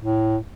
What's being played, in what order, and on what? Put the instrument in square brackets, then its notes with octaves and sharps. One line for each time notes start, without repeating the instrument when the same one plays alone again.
[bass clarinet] A2